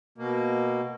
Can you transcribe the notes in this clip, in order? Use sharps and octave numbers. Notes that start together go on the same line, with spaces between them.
B2 A#3